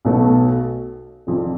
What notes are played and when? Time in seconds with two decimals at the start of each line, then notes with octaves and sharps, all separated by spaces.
0.05 B1 B2 A3
1.27 F1 F2 F3